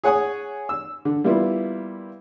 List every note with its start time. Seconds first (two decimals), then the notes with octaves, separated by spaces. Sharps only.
0.04 G#4 C#5 F#5 G#5 D#6
0.69 E6
1.05 D3
1.24 G3 A#3 B3 E4 F4